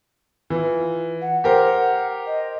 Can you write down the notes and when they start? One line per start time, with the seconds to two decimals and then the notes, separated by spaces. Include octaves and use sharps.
0.50 E3 F4
1.21 F#5
1.44 G4 A#4 C5
2.26 D#5